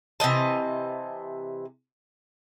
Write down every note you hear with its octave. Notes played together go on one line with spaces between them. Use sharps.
C3 E3 D#5 A5